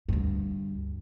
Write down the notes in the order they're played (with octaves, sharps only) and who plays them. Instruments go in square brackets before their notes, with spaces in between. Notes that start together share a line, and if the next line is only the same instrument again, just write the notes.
[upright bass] D2 G2